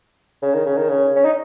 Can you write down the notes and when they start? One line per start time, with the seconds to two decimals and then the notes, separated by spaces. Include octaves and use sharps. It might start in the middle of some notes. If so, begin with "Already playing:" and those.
0.42 C#3
0.54 D#3
0.66 C#3
0.77 D#3
0.89 C#3
1.16 C#4
1.24 D#4